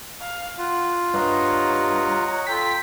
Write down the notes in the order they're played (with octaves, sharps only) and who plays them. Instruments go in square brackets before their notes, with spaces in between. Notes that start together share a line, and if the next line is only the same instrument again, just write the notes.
[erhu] F5
[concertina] F4 [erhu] F#5
[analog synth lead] G2 [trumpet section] C#5 D#5 F#5 [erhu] A#5
[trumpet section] F4 A4 G5 [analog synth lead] B6